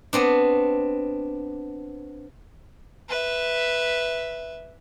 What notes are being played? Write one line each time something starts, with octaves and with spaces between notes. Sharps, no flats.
B3 C4 D4
B4 E5